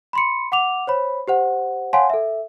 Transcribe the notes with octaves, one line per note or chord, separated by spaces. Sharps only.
B5 C6 C#7
F#5 D6 F7
C5 C#5 B5
G4 C5 F#5
C#5 F5 F#5 G#5 A5 C6
A4 E5